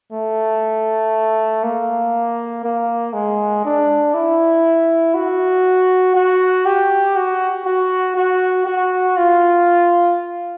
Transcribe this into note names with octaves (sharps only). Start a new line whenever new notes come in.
A3
A#3
A#3
G#3
D4
E4
F#4
F#4
G4
F#4
F#4
F#4
F#4
F4